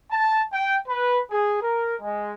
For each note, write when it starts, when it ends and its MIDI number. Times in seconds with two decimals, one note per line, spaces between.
0.12 0.42 81
0.52 0.76 79
0.88 1.20 71
1.31 1.58 68
1.62 1.95 70
2.01 2.33 56